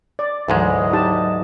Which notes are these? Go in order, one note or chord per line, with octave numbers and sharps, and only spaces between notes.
D5
D2 G#2 E3 F#3 G#3 D#5
D#4 G4 A5